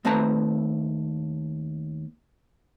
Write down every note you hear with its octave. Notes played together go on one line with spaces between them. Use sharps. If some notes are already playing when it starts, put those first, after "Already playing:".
D#2 A3 C4 B4 A5 A#5